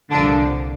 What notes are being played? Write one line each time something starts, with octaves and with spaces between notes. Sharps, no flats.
C2 A#2 D3 F3 D4